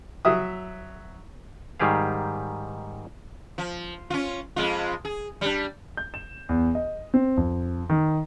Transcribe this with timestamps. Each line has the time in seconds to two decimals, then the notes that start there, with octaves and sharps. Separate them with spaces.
0.25 F#3 E5 D#6
1.80 G#2 D#3 G3 G4 G#4 F5
3.58 F3
4.10 C#4 F4
4.56 F2 G#3 F4
5.05 G#4
5.41 G3 D4
5.97 G6
6.14 E7
6.49 E2
6.75 D#5
7.14 C4
7.37 F2
7.90 D#3